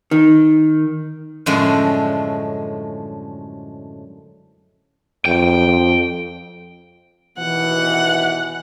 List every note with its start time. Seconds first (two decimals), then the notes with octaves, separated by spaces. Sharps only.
0.11 D#3
1.46 F#2 A2 D3 F3 G#3 A3
5.26 F2 G5
7.38 D#2 B2 E3 F#5